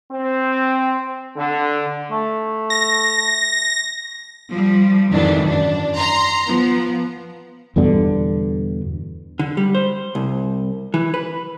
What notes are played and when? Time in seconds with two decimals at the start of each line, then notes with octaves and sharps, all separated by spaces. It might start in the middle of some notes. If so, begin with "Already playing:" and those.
0.11 C4
1.36 D3
2.11 A3
2.70 A#6
4.49 F3 G3
5.09 F2 G#2 D#3 E3 F#3 D4
5.48 F#2 D4
5.97 A#5 C6
6.48 F3 B3
7.76 E2 G2 B2 D3
9.39 D3
9.57 G3
9.75 C5
10.15 C2
10.94 E3
11.14 B4